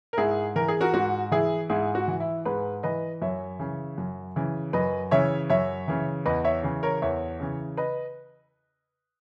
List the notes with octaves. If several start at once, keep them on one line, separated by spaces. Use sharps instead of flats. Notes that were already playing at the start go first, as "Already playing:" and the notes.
A#4
G#2 E4 G#4
E3 A#4
G#4
F#4 A#4
G#2 F#4
E3 E4 G#4
G#2 E4 G#4
F#4
E3
E4
G#2 G#4 B4
E3 B4 D#5
F#2 C#5 E5
C#3 E3
F#2
C#3 E3
F#2 B4 D#5
C#3 E3 C#5 E5
F#2 C#5 E5
C#3 E3
E2 B4 D#5
C#5 E5
C#3 E3
A#4 C#5
E2 C#5 E5
C#3 E3
B4 D#5